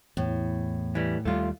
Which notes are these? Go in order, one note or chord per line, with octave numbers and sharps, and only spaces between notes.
E2 A2
E3 G3
D#2 G3 A3 F4